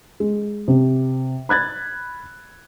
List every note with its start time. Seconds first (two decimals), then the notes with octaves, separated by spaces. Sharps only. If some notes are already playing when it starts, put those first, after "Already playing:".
0.20 G#3
0.68 C3
1.49 B5 F#6 G#6 A6